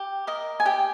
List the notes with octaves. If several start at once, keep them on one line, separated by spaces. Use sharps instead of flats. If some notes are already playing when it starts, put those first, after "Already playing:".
Already playing: G4
A#4 D#5
G#5
G4 G5